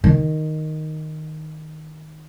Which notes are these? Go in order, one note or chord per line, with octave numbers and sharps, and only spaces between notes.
D#3